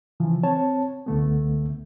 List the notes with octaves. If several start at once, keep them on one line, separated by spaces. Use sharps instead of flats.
C#3 E3 F3
C4 C#5 A5
C#2 D3 A3 B3